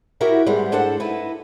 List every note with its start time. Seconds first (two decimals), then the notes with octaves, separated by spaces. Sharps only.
0.21 E4 F#4 G4 A#4 E5
0.46 G#2 G3 G#3 B3 C4
0.72 G#2 D4 A4 C5 F#5
1.00 D#4 E4 B4